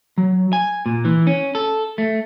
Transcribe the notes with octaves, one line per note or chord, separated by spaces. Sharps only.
F#3
G#5
A#2
E3
C#4
A4
A3